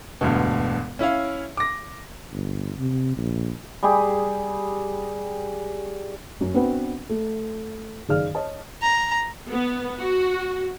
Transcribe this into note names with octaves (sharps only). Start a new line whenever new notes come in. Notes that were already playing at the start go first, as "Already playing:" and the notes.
E1 D2 G2 B2
C#4 E4 C#5 F5
D6 A#6
G1
C3
A#1
G3 G4 G#4
F#2
B3 C4 D4 F#4 B4 F#5
A3
F#1 D#3 G#4 D5 F5 F6
C#5 D#5 A5
A#5
B3
F#4